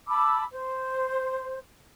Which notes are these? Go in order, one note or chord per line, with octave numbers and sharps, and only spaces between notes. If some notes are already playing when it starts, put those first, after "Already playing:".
A5 B5 D6 E6
C5